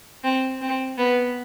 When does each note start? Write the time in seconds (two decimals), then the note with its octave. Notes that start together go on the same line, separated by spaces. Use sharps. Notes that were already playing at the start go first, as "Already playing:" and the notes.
0.24 C4
0.61 C4
0.98 B3